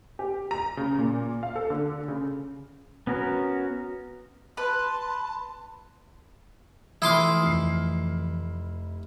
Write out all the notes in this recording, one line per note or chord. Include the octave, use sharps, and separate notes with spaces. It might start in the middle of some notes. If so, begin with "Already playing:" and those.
G4
A#5
C#3
A#2
F5
A4
D3
C#3
B3 C#4 F#4 A#4
B4 A5 C6
E3 F3 A3 E4 C6 D6 D#6 F6
F1 C7